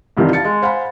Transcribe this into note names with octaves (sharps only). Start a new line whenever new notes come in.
C2 G2 C3 D#3 E3 F4
F5 A5 A6 C#7
G#3
C5 F5 F#5 G#5 B5